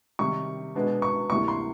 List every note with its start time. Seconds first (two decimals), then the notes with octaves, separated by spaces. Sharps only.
0.19 C3 D#3 G3 C#6
0.75 B2 G#3 B3 D4
1.02 C#6
1.30 D2 C3 E3 G3 A#3 C#6
1.48 C6